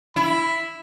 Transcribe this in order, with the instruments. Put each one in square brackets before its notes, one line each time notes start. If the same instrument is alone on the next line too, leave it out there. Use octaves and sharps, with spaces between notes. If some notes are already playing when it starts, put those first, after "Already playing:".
[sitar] E4 [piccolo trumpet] B5